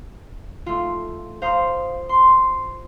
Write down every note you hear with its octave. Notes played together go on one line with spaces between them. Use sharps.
A3 F4
C5 F5 A#5 D#6
C6